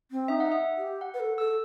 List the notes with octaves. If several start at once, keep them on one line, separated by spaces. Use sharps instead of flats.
C4
D#4 E5
F#5
E5
G4
F#5
B4
A4
A4 E6